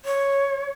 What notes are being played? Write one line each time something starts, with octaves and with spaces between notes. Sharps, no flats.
C#5